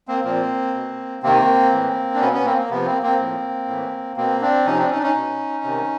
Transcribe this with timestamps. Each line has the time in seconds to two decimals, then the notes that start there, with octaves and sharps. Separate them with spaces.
0.08 A#3 C4
0.24 A#2 F3 A#3 C4
0.74 B2
1.22 C3 D#3 A#3 C4
1.72 A2 E3
2.14 D4
2.20 B2 B3 C#4
2.33 B3 C#4
2.45 A#3 C4
2.57 A#3
2.69 C3 F3 B3
2.86 A#3 C4
3.02 A#3 C4
3.19 A2 F3
3.68 A2 E3
4.17 B2 A#3 C4
4.41 C4 D4
4.65 C3 F3 C#4 D#4
4.78 C4 D4
4.90 C#4 D#4
4.98 D4
5.02 C#4 D#4
5.14 B2
5.64 C3 D#3